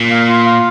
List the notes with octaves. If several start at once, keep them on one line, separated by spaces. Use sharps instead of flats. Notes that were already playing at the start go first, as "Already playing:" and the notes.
Already playing: A#2
F5
F4
F5